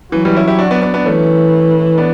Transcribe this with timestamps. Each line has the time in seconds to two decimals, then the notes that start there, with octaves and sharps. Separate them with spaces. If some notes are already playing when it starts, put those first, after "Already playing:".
0.12 E3 F#3
0.25 E3 G3
0.36 C#4 E4
0.48 E4 G4
0.59 D4 F#4
0.71 B3 D4
0.82 B3 D4
0.94 B3 D4
1.05 E3 A3 C#4
1.98 B3 D4